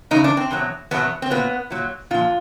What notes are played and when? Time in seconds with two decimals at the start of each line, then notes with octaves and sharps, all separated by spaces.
0.11 E2 C#3 F#3 D#4
0.24 D4
0.37 C4
0.51 E2 B2 F#3
0.91 E2 B2 F#3 B3
1.22 C4
1.30 A#2 F#3 B3
1.71 A#2 F#3
2.11 A#2 F3 F4